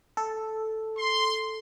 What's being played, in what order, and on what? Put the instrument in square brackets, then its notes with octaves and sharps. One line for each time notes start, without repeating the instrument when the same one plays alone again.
[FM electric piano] A4
[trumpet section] C6